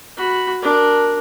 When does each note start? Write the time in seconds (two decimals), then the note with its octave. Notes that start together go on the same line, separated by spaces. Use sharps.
0.17 F#4 B5
0.62 D4 A#4